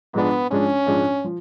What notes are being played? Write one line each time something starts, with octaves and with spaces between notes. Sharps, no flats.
G#2 F3 G#3 B3 D4
G#2 F3 G#3 C#4 D4
G#2 F3 G#3 D4
F3